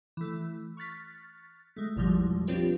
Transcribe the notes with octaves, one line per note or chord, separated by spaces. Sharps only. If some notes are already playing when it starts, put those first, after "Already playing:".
E3 A3
C#6 F6 F#6 A6 B6
G#3 A3
A1 E2 B2 F3 G3 G#3
C4 D4 F4 G4 B4 C#5